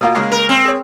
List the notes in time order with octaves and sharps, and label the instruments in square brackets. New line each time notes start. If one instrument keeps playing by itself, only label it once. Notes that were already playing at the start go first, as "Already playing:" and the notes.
[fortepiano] B2 A#3 F4
C#3 G#3 A#3
[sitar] A#4
C4
[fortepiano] G#4 C#5